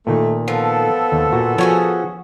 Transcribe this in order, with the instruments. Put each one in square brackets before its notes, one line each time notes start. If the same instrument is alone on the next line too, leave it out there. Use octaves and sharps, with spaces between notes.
[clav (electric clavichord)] A#2 D#3 [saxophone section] A3
[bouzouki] F3 [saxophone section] B3 A4
[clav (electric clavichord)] D#2
A#2 F#4
[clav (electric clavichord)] F3 [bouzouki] C#4 F#4 G#4